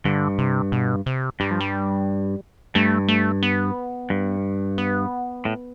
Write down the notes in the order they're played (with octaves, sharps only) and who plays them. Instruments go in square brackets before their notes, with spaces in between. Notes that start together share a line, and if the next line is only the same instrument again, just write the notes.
[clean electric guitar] G2 [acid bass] D3
[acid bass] C3
B2
C3
[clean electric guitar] G2 [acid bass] G3
[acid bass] F3
G3
[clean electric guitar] G2 [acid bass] A3
[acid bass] A3
B3
[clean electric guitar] G2
[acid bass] B3
[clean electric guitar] A2